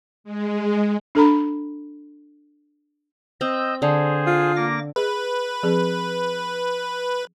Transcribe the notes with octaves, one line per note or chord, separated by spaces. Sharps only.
G#3
D4 A4 A#5 B5
C4 D#5 E6 G6
D3 G#4 C5
F4
A#3 D6 A#6
G#4 B4 D#5
F3 C4 G#4